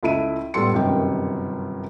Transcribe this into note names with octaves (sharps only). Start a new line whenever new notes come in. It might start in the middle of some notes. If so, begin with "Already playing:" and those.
C#2 A3 E4 D7 D#7
A2 G3 B3 A4 C6 C#7
G1 F#2 C3 D#3 G5